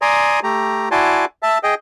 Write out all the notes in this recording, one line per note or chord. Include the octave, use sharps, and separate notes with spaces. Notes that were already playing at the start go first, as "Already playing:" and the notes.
D5 G#5 A#5 C6 D#6
A3 G4 A#5
E4 F#4 D5 G#5 A5 C6
E5 A5
G#4 D#5 G5